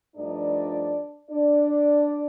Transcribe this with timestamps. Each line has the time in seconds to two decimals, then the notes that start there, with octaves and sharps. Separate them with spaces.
0.16 G2 F3 A3 D4 D#4 D5
1.31 D4 D5